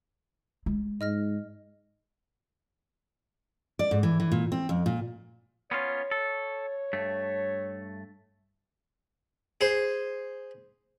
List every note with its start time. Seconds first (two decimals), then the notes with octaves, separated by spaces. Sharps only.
0.66 G#3
1.01 G#2 D#5 F6 A#6
3.79 D5
3.91 G#2
4.03 E3
4.20 E3
4.32 A#2
4.52 C4
4.69 F2
4.86 A#2
5.71 B3 C#4 F4 C#5
6.11 A4
6.93 G2 A3
9.61 G#4 C5